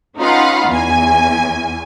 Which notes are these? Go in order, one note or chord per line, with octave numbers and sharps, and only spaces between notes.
C#4 D#4 F4 B4 F5 F#5
E2 G#5